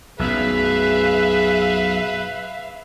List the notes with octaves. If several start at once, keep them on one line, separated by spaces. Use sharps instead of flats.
B1 F#2 G#4 B4 E5 F5